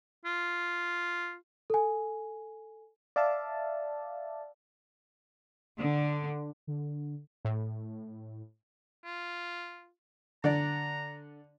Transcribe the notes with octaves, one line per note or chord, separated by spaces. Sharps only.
F4
A4 G#5
D5 E5 F5 A5
D3
D3
A2
F4
D3 D5 A#5